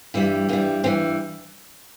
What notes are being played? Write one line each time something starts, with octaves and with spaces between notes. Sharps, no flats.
G2 E3 G3 E4
G2 E3 G3 A#3
G2 E3 G3 C4